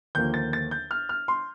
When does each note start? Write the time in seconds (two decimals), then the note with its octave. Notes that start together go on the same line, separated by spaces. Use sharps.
0.15 D#2 D3 F3 A#3 G6
0.34 A6
0.53 A6
0.71 G6
0.91 F6
1.09 F6
1.28 C6